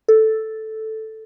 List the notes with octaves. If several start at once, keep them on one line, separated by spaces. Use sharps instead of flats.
A4